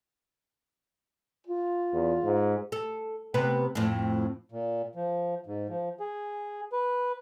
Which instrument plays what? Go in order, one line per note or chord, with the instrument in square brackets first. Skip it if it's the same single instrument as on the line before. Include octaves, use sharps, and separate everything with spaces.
[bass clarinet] F4
[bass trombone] E2
G#2
[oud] A4
C3 B3 B4
F2 A2
[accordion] A#2
F3
G#2
F3
G#4
B4